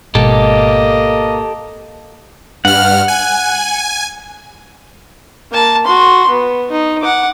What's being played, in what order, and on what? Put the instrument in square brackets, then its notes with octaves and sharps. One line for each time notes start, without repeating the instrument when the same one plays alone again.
[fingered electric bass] G#1 B2 G#3 [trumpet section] A#3 D#5 [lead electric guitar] G4 A4
[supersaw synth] G2 F6 [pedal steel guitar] F#5
[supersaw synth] G#5
[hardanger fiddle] A#3 A5
F#4 C6
B3
D#4
F#5 D6